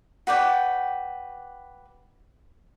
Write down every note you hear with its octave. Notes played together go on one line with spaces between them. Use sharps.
F#4 B4 D5 G5